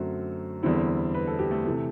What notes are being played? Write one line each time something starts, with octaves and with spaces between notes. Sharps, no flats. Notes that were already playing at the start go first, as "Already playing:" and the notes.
Already playing: F#2 D3 F#3 A3 C4 F#4
E2 D3 G3 C4 E4
B4
A4
G4
A3 A4
C3 E3 A3